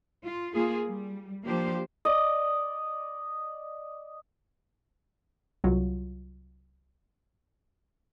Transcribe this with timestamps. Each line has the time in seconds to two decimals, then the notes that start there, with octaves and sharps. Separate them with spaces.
0.24 F4
0.53 A#3 F4 G#4
0.85 G3
1.44 F3 A#3 D4 G4 C5
2.05 D5 D#5
5.64 C2 F#3 F4